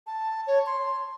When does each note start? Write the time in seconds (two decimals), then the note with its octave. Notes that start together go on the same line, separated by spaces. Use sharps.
0.07 A5
0.47 C#5
0.66 C6